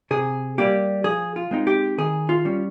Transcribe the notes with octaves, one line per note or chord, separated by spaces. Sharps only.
C3 G#4
G3 A#3 G4
F3 G#4
F4
G#3 C4 D#4
G4
D#3 G#4
F4
G3 C#4